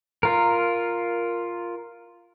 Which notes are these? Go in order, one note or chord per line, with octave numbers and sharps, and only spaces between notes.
F4 A#4